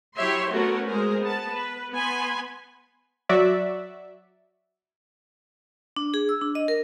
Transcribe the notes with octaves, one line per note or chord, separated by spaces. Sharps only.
F#3 E4 G4 C#5 E5 C6
A3 B3 C#4 F#4 A4 A#4
G#3 G#4 A#4 C5
B3 A5
B4
B3 G#5 B5 C6
F#3 F#4 D5 E5
D4
G#4
E6
D4
D#5
A#4